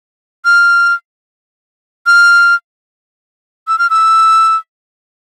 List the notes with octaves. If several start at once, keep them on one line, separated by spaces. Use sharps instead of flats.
F6
F6
E6
F6
E6